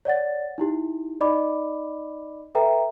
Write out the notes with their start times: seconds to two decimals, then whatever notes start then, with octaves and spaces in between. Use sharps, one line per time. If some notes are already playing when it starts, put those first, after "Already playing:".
0.05 C#5 D5 F#5 A6
0.58 D#4 E4 G4
1.20 D#4 D5 D#5 B5 D6
2.55 A4 B4 E5 G5 A#5